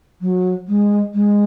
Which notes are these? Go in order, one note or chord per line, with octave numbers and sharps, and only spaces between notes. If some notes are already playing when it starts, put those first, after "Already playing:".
F#3
G#3
G#3